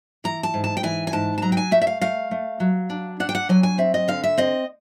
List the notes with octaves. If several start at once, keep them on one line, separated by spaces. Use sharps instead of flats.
E3 A#5
A5
G#2
A5
G5
E3 G#5
G#5
G#2 A5
A5
F#3 A#5
G5
G#5
A3 E5
E5
F5
A3 F5
A3
F#3
D4
D4 F#5
G5
F#5
F#3 G#5
G#5
C4 E5
D#5
D3 F5
E5
C4 D#5